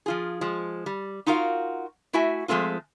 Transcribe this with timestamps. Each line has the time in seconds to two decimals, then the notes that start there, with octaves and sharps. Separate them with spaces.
0.06 F3 F4 G#4
0.41 F3 G#3
0.86 G3
1.26 D#4 F4 F#4 A#4 F5
2.13 A3 E4 F#4 E5 G#5
2.48 F3 G#3 A3 C4 F4